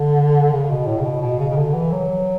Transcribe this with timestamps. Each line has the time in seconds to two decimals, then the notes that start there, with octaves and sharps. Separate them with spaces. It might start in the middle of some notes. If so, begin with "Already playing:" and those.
Already playing: D3
0.52 C#3
0.70 B2
0.87 A2
0.99 C#3
1.05 B2
1.21 B2
1.39 C#3
1.50 C#3
1.57 D3
1.74 E3
1.92 F#3